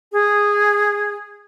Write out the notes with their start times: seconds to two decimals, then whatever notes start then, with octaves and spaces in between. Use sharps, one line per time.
0.12 G#4